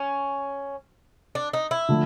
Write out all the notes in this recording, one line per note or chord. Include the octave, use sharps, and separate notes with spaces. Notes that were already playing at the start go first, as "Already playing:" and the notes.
Already playing: C#4
D4
D#4
E4
D3 F3 A3